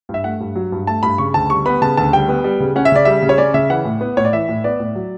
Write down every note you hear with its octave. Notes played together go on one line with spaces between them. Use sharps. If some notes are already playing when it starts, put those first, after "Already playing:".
G2
E5
A3 F#5
G2
F#3
G2
A3 A5
G2 B5
C#3 C#6
D2 A5
G3 C#6
B3 B5
C#3 A5
D2 A5
G3 G5
B3
G3
C#3
C#4 F#5
E5
C#3 D5
G3 E5
C#3
C#5
C#4 D5
C#3 E5
E3 F#5
A2
B3
A2 C#5
D5
E3 E5
A2
B3 D5
A2
F#3